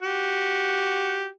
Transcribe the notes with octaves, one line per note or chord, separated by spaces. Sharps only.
F#4 G4